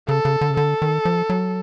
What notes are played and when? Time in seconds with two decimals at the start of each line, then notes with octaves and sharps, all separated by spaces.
0.08 C#3 A4
0.25 C#3
0.41 D3
0.50 C#3
0.57 D3 A4
0.82 D#3
1.05 F3
1.30 F#3